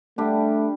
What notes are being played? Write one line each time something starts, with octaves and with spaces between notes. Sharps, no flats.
G3 A3 D4 G4